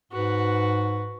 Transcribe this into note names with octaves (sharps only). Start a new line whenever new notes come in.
G#2 F#4 B4